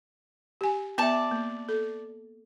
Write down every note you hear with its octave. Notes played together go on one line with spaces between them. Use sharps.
G4 G#5
B3 D5 E5 A5
A#3
A4